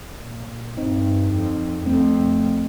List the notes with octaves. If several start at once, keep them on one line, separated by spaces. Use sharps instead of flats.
A#2
G2 C4 D#4
F2
F2 A3 C4